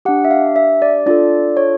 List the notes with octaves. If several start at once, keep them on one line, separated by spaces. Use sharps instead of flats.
D4 G4 F#5
E5
F5
E5
D5
D4 F4 A4 D5
C#5